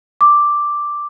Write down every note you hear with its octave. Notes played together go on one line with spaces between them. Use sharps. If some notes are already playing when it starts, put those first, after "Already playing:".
D6